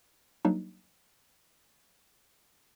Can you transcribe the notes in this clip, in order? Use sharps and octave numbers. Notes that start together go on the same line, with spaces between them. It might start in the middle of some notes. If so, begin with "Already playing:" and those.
F#3 G3 A#3 D4 D#4